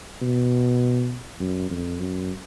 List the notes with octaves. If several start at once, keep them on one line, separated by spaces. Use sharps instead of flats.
B2
F#2
F2
F#2